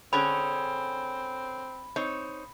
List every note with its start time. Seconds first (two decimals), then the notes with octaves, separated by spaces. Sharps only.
0.13 D3 C4 C#4 G#4 B5
1.96 C4 D#4 C#5